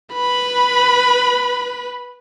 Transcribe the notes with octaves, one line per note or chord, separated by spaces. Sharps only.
B4 B5